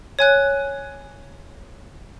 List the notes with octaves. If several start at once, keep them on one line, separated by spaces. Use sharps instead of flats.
C#5 G#5 F#6